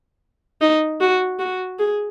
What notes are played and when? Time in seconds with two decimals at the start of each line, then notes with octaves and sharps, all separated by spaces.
0.61 D#4
1.01 F#4
1.39 F#4
1.79 G#4